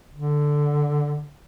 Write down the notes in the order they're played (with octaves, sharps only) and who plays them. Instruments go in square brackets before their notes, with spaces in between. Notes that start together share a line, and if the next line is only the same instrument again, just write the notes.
[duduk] D3